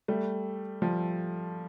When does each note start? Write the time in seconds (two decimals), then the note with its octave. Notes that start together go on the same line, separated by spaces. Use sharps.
0.08 G3 A3
0.82 F3 G3